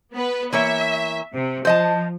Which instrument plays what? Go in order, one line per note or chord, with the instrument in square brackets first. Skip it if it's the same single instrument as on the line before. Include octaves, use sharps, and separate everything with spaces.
[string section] B3 B4
[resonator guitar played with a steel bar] E3 A#3 C#5 [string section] E5
[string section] C3
[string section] F3 [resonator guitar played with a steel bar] C5 D#5 A5